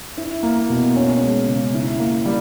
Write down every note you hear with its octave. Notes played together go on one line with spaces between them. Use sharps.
E4
A#3
B2
C#4
G#3
C#3
E4
A#3
G3